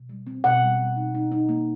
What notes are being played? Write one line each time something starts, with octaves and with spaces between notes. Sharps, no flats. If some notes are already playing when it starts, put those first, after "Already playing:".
Already playing: B2
G3
C4
B2 F#5
G3
G3
D#4
D#4
D#4
A#3